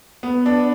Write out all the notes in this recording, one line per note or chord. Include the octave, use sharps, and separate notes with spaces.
B3
D4